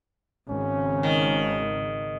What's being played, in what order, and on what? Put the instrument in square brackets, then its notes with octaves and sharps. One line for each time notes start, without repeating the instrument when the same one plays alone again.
[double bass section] G#1 C#3 [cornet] C#4
[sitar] D#3